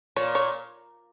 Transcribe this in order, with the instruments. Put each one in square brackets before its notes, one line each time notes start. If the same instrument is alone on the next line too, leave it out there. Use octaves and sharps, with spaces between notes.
[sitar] A#2 [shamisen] C#5
[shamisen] C#5